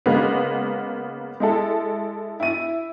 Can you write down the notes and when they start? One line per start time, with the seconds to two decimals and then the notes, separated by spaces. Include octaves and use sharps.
0.06 C#3 G#3 A#3 B3 D#4
1.40 G#3 E4 A4
2.40 E4 D#7